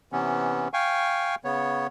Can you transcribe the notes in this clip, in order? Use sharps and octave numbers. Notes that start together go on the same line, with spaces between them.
C3 E3 B3 C#4
F5 G5 G#5 C#6
C#3 B3 C#5